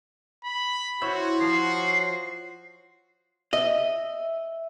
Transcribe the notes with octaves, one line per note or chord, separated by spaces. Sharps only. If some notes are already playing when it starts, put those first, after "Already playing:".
B5
E4 F#4 C5 C#5
F3 C7
D#5 E5